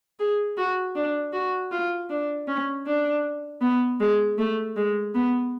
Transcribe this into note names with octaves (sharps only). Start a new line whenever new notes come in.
G#4
F#4
D4
F#4
F4
D4
C#4
D4
B3
G#3
A3
G#3
B3